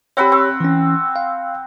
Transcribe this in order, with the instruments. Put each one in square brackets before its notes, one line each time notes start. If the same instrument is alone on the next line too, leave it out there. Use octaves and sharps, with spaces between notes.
[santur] C4 F#5 B5 [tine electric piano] G4 C#5
[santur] C4
[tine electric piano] E3 C#4
F5